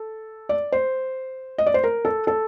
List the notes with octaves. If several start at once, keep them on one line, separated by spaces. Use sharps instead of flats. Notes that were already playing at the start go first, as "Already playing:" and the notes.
Already playing: A4
D5
C5
D#5
D5
C5
A#4
A4
A4